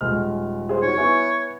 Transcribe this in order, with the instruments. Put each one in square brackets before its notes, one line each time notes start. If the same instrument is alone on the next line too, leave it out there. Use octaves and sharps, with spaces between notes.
[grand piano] D#1 G#3 F6
[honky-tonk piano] G#4 C5
[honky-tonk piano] D#4 F#4 [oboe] C#5
[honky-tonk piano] B3 E4 [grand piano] E5 G#5 C#6